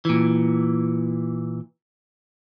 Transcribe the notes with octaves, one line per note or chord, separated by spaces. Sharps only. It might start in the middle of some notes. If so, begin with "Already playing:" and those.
A#2 E3